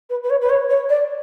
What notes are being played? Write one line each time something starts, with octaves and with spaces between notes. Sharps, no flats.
B4
B4
C#5
B4
C#5
C#5
D5